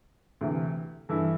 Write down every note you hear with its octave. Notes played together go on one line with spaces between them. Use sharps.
D2 C3 E3
G2 E3 E4 A4